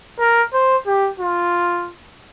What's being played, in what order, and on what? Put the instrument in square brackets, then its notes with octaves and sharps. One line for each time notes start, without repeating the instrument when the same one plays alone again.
[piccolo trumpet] A#4
C5
G4
F4